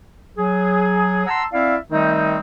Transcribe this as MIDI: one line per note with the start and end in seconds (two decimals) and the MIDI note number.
0.37 1.24 54
0.37 1.24 68
1.27 1.44 78
1.27 1.44 81
1.27 1.44 82
1.27 1.44 84
1.27 1.44 88
1.54 1.76 60
1.54 1.76 64
1.54 1.76 74
1.54 1.76 76
1.54 1.76 77
1.91 2.39 51
1.91 2.39 55
1.91 2.39 57
1.91 2.39 60
1.91 2.39 63